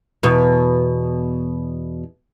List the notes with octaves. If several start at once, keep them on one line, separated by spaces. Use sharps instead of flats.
E2 B2